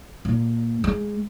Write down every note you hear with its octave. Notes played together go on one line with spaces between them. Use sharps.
A#2
G#3